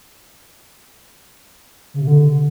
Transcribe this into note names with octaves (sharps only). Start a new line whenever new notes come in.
C#3
C3
D3